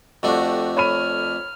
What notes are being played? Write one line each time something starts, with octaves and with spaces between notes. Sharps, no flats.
F2 A3 D4 F#4 G4
C#5 B5 F6 D#7